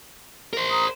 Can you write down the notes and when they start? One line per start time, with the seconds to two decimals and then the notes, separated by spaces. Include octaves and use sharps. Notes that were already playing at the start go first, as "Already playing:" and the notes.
0.53 A#4 C5
0.70 A#5 D#6